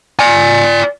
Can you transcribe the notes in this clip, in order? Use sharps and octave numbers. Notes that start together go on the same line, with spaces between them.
D5 G#5